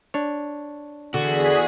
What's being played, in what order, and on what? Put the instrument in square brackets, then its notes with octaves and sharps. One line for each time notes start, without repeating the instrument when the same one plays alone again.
[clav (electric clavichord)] D4 C#5
[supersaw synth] E2 G#4 B6 [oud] D3 [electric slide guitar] F#4